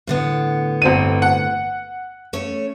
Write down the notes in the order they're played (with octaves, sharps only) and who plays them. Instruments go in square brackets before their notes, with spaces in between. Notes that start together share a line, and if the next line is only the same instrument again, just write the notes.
[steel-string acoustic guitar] A2 D3 B3
[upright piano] G1 C4 D#7
F#5
[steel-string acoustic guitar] A3 C#4 C#5